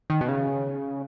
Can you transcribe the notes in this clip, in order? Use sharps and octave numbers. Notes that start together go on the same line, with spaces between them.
D#3
B2
C#3